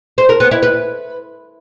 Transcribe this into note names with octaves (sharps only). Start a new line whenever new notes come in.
C5
A#4
B3
E4
B4